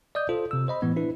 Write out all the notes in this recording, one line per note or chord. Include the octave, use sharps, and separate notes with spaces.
D5 D#5 D#6 G6
F4 A4 C5
C3 E6
C5 D#5 B5
A2 E3 B3
D4 E4 B4